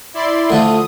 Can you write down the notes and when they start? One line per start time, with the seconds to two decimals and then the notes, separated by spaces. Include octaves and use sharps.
0.14 E4 D5 C6
0.50 D3 F3 A3 F4 D#6